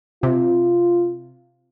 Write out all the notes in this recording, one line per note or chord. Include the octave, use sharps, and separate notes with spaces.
C3 F4